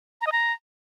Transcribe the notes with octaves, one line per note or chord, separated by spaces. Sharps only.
A#5
D#5
A#5